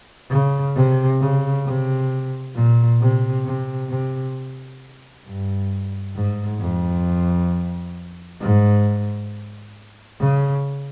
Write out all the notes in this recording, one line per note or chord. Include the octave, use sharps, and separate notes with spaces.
C#3
C3
C#3
C3
A#2
C3
C3
C3
G2
G#2
F2
G#2
C#3